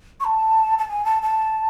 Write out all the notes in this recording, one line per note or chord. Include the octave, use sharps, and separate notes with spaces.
C#6
A5
A5
G#5
A5
A5